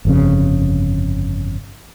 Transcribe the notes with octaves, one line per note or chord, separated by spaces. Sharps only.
G1 F2 C#3